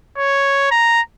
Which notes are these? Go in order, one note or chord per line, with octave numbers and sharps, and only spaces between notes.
C#5
A#5